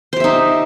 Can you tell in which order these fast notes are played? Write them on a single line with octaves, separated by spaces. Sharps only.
C5 G4 E5 D#4